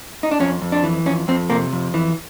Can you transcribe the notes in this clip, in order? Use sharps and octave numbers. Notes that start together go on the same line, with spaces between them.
D#4
D4
F2 C#4
F2
D4
E3
F2 C#4
F2 C4
C3 A#3
F2
E3